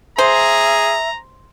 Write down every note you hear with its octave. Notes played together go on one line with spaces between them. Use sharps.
G#4 C5 E5 A#5